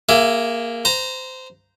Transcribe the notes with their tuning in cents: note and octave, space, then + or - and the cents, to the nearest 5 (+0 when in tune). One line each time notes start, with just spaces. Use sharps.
A#3 +0 G#4 +0 E5 +25
C5 -20 A#5 +0